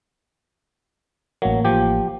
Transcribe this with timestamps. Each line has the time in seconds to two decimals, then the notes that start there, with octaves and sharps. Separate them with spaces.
1.42 A1 F#3 A#3
1.65 F3 G4